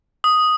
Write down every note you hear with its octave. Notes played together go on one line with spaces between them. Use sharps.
D#6